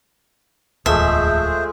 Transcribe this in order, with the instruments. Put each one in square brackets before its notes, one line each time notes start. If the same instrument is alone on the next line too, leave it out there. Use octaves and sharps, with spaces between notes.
[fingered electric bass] D1 E2 [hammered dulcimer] F3 G#3 A3 [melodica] G#4 C5 [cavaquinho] E5